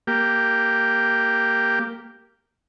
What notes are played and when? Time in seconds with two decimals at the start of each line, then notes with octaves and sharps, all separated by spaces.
0.07 A#3 G4